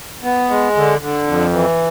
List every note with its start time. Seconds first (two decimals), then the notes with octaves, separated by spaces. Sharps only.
0.23 B3
0.50 G#3
0.76 D3
1.01 D3
1.27 F2
1.53 E3